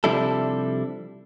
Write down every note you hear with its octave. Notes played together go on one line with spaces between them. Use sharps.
C3 F3 G3 D4 E4 A4